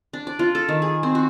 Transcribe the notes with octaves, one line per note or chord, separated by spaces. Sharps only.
D4
D5
F4
A4
D#3
G#4
C4
F#4